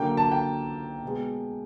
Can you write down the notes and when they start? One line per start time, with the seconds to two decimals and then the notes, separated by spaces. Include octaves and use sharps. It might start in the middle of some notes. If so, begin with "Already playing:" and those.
Already playing: D3 F#3 A#3 G5
0.17 A5
0.32 G5
1.03 B2 G#3